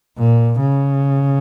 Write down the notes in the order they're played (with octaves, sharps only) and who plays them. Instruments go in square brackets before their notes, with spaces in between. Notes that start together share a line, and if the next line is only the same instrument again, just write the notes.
[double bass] A#2
C#3